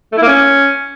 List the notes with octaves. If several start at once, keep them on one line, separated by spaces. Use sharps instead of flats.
A3
E4
A#3
C#4